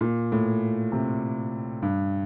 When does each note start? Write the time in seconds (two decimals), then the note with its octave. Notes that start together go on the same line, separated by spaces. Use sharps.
0.01 A#2
0.32 A2
0.92 C3
1.82 G2